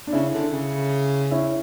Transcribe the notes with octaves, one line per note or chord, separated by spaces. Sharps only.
D4
C#3 C#4 E4
D3
C#3
C#4 E4